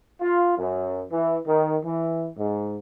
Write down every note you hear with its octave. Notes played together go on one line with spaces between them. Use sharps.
F4
F#2
E3
D#3
E3
G#2